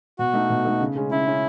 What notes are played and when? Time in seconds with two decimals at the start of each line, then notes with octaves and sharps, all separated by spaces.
0.19 B2 F#4
0.33 A3 D#4 A4
0.50 B2
0.64 A3 D#4 A4
0.81 C#3
0.96 G#3 C#4
1.11 C#3 E4
1.26 G#3 C#4